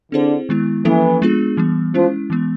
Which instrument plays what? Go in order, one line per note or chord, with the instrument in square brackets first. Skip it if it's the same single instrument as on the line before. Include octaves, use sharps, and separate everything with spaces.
[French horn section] D3 [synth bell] C4 E4 G#4 C5
[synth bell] D#3 G#3 B3 E4
[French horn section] E3 [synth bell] F3 A#3 C#4 E4 A4
[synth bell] G#3 B3 D4 F4 G#4
E3 G3 B3
[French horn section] F3 [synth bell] G#3 C#4 E4
[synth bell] E3 G#3 B3